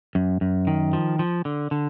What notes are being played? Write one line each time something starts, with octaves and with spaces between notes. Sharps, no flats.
F#2
F#2
D#3
F3
F3
D3
D3